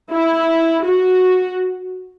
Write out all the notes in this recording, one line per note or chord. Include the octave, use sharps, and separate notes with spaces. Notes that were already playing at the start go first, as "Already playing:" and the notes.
E4
F#4